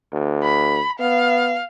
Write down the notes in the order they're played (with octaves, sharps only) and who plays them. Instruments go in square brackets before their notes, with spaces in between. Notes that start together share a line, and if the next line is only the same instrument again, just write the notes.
[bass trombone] D2
[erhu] B5
[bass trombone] B3 [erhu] F5